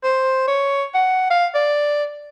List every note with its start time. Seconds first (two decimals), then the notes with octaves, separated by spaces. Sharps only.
0.04 C5
0.48 C#5
0.95 F#5
1.30 F5
1.55 D5